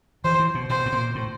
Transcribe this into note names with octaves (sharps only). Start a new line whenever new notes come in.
E3 C5
E3
B2
B2 C5
A2
A#2
A2